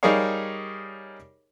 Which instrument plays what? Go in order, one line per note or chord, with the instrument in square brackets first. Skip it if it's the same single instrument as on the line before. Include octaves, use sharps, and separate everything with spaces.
[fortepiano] G3 D#4 G#4 A#4 C#5 F5